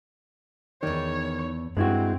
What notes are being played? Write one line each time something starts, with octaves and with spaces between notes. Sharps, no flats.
E2 D#3 C#5 D5
G2 G#3 C4 E4 F#4